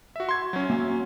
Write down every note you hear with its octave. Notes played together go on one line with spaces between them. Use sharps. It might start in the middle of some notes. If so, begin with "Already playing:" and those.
F#4 E5
C6 G#6
F#3 C#4
A#3 E5 G#5